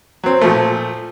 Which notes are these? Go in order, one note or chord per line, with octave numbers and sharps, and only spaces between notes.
F#3 C4
A#2 F3 A3